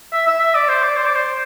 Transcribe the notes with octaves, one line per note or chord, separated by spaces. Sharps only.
E5
E5
E5
D5
C5
D5
C5
D5
C5